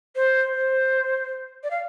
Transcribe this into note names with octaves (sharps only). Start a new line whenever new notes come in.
C5
C5
D5
F5